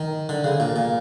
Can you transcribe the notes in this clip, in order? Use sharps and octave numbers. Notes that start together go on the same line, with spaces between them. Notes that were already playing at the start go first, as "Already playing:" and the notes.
Already playing: D#3
D3
C#3
A#2
A#2